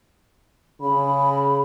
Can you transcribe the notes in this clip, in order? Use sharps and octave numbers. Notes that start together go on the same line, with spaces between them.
C#3 B5